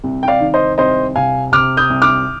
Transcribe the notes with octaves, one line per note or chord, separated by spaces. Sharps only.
C2
G5
D5 F5
D#3
C5 D#5
C2 C5 D#5
C3 F5 G#5
C3 D6 F6
D#6 G6
C2
D6 F6